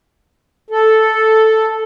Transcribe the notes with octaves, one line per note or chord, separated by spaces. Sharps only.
A4